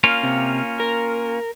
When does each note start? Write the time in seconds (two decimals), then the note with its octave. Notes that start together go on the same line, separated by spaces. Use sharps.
0.04 A#3 C#4 F4
0.24 C3
0.80 A#4